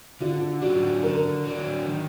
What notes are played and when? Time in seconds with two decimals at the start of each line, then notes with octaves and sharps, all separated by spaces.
0.20 D3 F4
0.61 F#3 D4 F#4
1.03 D3 A#4
1.45 F#3 D4
1.86 D#3